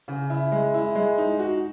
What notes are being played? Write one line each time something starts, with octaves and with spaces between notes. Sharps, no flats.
C#3
E4
G#3
E4
G#3
D#4
F#4